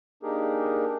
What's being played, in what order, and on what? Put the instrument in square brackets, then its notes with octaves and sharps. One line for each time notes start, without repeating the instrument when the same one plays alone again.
[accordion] A#3 D4 D#4 G4 G#4 A#4